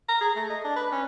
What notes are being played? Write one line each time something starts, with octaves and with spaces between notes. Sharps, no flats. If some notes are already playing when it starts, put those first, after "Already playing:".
A#5
G#4
A3
D#5
D4
B4
C#4